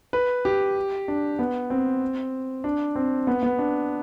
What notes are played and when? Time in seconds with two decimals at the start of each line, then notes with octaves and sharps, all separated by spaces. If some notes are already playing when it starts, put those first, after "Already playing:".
0.13 B4
0.45 G4
1.08 D4
1.39 B3
1.70 C4
2.64 D4
2.96 C4
3.27 B3
3.43 B3
3.58 D4